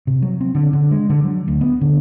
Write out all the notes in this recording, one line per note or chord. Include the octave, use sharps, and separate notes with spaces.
C3
F#3
C4
D3
D3
G#3
D3
F#3
D2
B3
D3